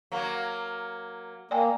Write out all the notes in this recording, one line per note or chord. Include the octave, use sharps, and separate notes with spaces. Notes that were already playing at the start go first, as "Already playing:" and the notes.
F#3 A#3
A#3 D5 G5 G#5